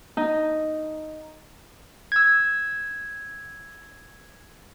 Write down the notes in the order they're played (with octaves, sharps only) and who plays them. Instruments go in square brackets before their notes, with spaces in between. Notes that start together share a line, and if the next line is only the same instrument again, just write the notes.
[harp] D#4
[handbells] E6 G#6